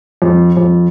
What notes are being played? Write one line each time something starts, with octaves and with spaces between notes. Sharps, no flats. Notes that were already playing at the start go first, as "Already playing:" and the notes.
F2
F2